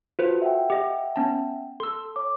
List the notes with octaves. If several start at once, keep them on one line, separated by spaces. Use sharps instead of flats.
F4 F#4 A4 B4 C5
E5 F#5 G5
G4 D#5
B3 C#4 A5
A4 C6 E6
C#5 D6